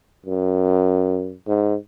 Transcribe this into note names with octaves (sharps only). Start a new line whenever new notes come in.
F#2
G#2